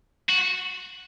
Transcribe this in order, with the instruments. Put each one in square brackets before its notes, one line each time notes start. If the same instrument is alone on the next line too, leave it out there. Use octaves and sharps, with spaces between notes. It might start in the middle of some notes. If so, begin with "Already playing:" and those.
[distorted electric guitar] F#4